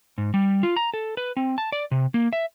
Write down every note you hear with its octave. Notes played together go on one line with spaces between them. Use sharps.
G#2
G3
F4
A#5
A4
B4
C4
A5
D5
C3
A#3
E5